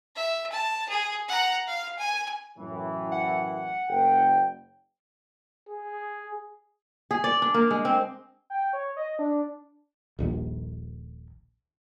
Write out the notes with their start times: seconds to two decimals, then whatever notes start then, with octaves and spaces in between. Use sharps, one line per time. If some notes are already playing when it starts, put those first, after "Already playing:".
0.16 E5
0.52 A5
0.89 G#4
1.29 F#5 A#5
1.67 F5
1.99 G#5
2.59 F#2 A2 E3
3.12 F#5
3.89 F#1 G5
5.69 G#4
7.11 G#4
7.24 D5
7.42 D4
7.54 A#3
7.71 G#3
7.85 C4
8.50 G5
8.73 C#5
8.97 D#5
9.19 D4
10.19 D#1 A#1 D#2